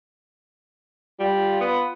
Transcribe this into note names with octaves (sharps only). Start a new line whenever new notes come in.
G3 F4
B3